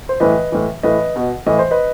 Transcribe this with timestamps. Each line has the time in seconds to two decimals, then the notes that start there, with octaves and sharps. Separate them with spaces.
0.09 C5
0.20 A2 E3 B4 D#5
0.52 A2 E3
0.83 A2 E3 B4 D#5
1.16 B2
1.46 A2 E3 D#5
1.59 C5
1.71 B4 D#5